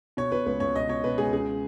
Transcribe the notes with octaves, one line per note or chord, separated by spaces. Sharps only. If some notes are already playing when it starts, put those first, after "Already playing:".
B2 C#5
B2 B4
C#2 B4
C#2 C#5
B2 D#5
B2 C#5
B2 B4
C#2 G#4
C#3 G#4